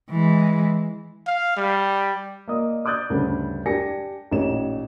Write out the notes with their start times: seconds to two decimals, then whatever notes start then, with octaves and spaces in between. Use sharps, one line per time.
0.11 E3 G#3
1.27 F5
1.57 G3
2.48 A#3 D5 D#5 D#6
2.85 D5 D6 D#6 F#6 G6 A6
3.10 D2 G2 C#3
3.66 D4 G4 D5 G#5 A#6 C#7
4.32 A1 A#2 D#4 G4 C#5 E7